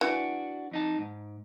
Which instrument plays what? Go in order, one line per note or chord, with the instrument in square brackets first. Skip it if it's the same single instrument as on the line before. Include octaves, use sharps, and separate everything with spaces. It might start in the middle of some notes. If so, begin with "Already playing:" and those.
[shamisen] E3 [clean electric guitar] D4 F#4
[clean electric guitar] F2 D#4 A5
G#2